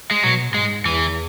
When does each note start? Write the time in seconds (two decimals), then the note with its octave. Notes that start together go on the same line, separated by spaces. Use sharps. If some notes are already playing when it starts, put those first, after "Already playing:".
0.11 G#3
0.23 B2 F#3
0.54 G#2 G#3
0.86 E2 E3